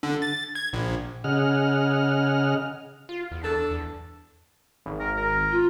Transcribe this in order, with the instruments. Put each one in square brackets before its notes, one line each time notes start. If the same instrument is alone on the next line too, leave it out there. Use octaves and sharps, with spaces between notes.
[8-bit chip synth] D3
A6
G#6
A#1
[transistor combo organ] C#3 G#4 D#5 F#5 F6
[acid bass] F4
E2
[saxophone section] D4 A4
[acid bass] E2
[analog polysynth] G#1
[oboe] A#4
A#4
[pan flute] F4